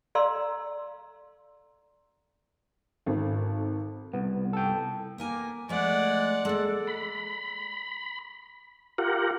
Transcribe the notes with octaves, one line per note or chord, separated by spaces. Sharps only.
A4 D5 F5 A#5 C6 E6
G#1 A4
C2 B3
A4 G5
A#3 B3 A#4 G#5
F3 G#3 A3 D5 F#5
G#3 A#3 A4
B5
F4 G4 A#4 F#5